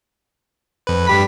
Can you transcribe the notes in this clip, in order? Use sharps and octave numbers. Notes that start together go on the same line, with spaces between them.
F2 B4
G2 G4 B5 B6